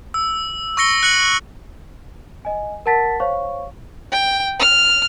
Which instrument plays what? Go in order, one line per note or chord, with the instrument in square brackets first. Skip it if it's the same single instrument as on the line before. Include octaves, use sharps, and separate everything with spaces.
[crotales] E6
C#6 E6 A#6 C#7 G7
F#6 C#7 F#7
[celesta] D#5 G#5
A#4 F#5 A5 A6 B6
C5 C#5 F5 C#6
[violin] G5
F6